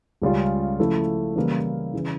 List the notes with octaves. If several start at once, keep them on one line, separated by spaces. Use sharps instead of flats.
C#2 C#3 G3 C#4 F4
C#3 F3 A3 E4
C#3 E3 G3 A#3 E4
C#3 E3